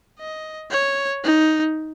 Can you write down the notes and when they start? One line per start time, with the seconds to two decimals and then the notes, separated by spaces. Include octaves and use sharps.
0.19 D#5
0.71 C#5
1.24 D#4